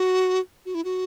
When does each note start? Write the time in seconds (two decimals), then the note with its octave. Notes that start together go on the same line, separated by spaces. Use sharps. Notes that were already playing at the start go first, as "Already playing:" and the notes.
Already playing: F#4
0.66 F#4
0.75 E4
0.85 F#4